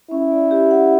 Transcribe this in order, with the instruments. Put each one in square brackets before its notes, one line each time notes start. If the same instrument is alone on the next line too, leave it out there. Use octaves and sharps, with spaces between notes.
[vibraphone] C#4 [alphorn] E4
[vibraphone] D5
G4
F#5